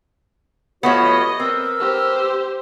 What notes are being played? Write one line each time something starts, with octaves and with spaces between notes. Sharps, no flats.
F3 A3 B3 F#4 G4 C#5 D#5
C4 A#4 B4 E6
G4 C5